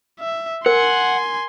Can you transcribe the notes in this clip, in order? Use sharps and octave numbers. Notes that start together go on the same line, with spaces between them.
E5
A#4 F#5 G#5 C6